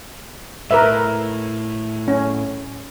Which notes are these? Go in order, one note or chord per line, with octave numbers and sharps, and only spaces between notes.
A2 A#4 B4 E5
C#4